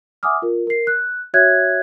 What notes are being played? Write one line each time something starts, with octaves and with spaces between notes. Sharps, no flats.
E5 F#5 G#5 D6 D#6 F6
F4 A#4
A#4 C7
F#6
F#4 C#5 E5 F#6 G#6